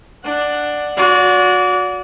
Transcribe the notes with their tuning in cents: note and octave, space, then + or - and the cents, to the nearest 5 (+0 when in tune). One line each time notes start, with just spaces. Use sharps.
D4 +10 F#5 +0
F#4 -25 D5 -35